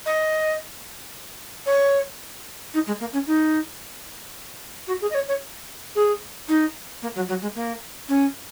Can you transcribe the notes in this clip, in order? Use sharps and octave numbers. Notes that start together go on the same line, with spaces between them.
D#5
C#5
D#4
G#3
A#3
C#4
D#4
F#4
G#4
D#5
C#5
C#5
G#4
D#4
A#3
F#3
F#3
G#3
A#3
C#4